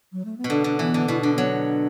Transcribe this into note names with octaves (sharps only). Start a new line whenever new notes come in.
F#3
A3
B3
B2
D3 D4
D3
E3 B3
D3
B2 E4
D3 D4
F#3 B3
D4